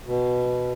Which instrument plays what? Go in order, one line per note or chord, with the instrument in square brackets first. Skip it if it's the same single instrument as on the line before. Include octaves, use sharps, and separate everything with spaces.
[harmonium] B2